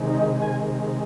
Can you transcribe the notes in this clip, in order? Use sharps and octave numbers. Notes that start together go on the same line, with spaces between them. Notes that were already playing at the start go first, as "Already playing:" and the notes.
Already playing: C3 D#3 G#3
D#4
G#5